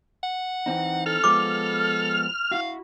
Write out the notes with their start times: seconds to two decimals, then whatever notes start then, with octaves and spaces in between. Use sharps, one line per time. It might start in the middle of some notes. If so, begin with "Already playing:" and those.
0.23 F#5
0.66 E3 C4 D#4
1.06 A4 F6
1.24 F3 G#3 B3 D6
2.51 E4 F#4 F5